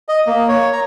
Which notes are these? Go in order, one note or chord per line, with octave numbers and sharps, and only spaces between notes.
D#5
A#3
C#5
A#5